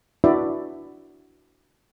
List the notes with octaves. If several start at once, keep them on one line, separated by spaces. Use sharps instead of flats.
D4 E4 F#4 B4 D5 E5